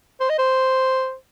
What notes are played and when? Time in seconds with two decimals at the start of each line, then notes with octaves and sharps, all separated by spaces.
0.20 C5
0.30 D#5
0.39 C5